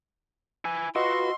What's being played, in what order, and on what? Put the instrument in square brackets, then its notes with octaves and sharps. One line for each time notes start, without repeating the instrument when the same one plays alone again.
[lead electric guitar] E4 G#5
[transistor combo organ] F4 B4 [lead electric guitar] F#4 [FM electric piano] D#5 F#5 E6 [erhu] C6